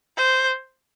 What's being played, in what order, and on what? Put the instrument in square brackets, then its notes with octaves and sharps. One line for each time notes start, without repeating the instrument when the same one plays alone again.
[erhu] C5